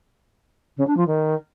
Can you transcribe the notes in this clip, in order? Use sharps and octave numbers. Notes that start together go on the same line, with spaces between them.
C#3
D4
F3
D#3